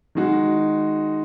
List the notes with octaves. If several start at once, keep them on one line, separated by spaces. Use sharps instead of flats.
D#3 G#3 D#4 F#4